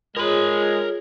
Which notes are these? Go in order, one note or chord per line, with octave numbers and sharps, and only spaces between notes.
G#3 F4 G#4 A#4 C#5 B5